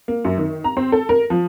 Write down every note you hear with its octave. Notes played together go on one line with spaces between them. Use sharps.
A#3
F#2
D#3
A#5
C4
A4
A#4
F3